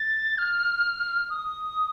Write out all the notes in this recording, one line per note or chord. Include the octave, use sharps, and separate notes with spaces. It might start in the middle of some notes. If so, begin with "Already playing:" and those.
Already playing: A6
F6
D#6